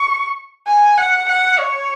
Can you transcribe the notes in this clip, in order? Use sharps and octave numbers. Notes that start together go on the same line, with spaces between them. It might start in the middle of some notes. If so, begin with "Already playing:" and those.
Already playing: C#6
G#5
F#5
F#5
C#5